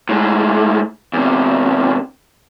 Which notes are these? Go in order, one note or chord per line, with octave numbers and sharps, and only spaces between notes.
A2 G#3
E2 C3